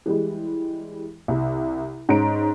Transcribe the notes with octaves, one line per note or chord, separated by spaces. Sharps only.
E3 G3 G#3
C2
G#2 C#4 A#5 D7